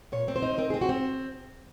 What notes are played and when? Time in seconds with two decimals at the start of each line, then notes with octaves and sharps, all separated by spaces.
0.12 A#2 C#5
0.28 C4
0.36 C5
0.42 D#4
0.58 C4 A#4
0.70 C4 G#4
0.81 F#4
0.89 C4